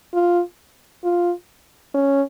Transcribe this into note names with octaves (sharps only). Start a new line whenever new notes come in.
F4
F4
C#4